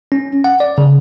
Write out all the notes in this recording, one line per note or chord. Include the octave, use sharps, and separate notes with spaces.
C#4
F#5
D5
C#3